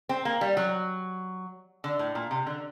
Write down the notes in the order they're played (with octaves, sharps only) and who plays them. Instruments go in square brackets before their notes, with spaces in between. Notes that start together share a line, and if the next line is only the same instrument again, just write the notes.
[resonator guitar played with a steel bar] C4
A#3
G3
F#3
D3
A2
A#2
C3
D3